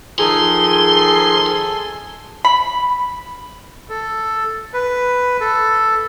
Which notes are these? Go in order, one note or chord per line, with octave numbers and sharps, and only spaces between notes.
D#3 F3 G#4 A4 G#5 C6
B5
A4
B4
A4